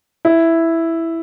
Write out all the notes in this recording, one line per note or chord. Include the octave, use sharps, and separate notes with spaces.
E4